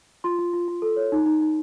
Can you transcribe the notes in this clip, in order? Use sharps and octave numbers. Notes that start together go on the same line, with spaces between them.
F4 C6
F4
F4
F4
A4
C#5
D#4
D#4
D#4